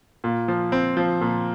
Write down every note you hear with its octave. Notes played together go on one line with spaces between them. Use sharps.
A#2
F3
C4
F3
A#2